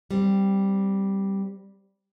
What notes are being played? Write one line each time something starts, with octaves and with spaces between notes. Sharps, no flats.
G3 C4